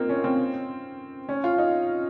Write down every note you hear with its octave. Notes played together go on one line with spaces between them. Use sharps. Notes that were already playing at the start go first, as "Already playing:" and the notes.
Already playing: A#3 C4 D#4 F4
C#4
C4
C#4
F4
D#4